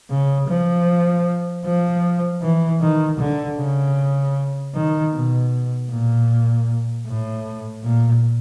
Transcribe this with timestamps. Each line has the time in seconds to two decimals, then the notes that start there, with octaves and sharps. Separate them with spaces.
0.10 C#3
0.48 F3
1.65 F3
2.42 E3
2.81 D#3
3.19 D3
3.58 C#3
4.75 D#3
5.14 B2
5.91 A#2
7.07 A2
7.84 A#2